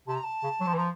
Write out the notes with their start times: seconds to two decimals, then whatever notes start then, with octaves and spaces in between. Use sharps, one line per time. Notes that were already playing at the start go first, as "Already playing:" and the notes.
0.07 C3 A5
0.15 A#5
0.24 A5
0.43 C#3
0.60 F#3
0.67 F3
0.73 E3
0.78 F3 A#5